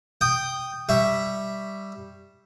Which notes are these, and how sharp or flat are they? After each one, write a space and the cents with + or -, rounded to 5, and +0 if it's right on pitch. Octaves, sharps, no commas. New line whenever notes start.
G5 +0 D#6 -10
G3 +0 E5 +0 C#6 +0